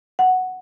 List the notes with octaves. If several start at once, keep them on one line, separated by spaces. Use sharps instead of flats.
F#5